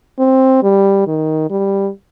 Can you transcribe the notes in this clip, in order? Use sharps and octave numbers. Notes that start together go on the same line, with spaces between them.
C4
G3
D#3
G3